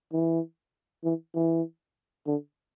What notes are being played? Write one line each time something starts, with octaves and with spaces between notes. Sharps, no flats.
E3
E3
E3
D3